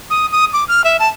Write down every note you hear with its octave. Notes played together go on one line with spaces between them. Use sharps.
D#6
D#6
D6
F6
E5
A5